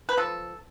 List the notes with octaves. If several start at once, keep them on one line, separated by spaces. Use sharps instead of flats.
B4
F3 A4